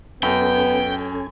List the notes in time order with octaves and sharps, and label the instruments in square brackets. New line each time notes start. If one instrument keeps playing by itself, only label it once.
[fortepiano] F#2 [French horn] B3 [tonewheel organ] C#4 A4 G#5 [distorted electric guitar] G5